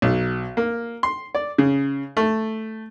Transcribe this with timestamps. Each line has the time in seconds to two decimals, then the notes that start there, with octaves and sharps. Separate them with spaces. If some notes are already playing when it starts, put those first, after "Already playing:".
0.02 B1
0.57 A#3
1.03 C6
1.35 D5
1.58 C#3
2.17 A3